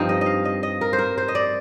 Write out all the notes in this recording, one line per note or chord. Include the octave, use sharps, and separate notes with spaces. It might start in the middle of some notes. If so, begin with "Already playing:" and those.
Already playing: G2 F3 C4 D#4
D#5
D#5 F5
D#5
D#5
A#4
C5
A#4
C5
D#5
D5